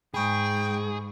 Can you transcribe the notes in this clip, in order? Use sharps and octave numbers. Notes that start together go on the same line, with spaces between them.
G#2 G#4 G5 B5 C#6 D#6